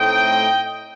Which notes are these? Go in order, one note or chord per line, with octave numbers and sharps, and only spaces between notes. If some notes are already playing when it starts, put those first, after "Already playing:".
Already playing: A2 A3 C4 D#4 D#5 G5